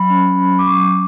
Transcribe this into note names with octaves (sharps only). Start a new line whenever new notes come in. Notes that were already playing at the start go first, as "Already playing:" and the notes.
Already playing: F#3 B5
C#4
F#3
D6
F#3 C#6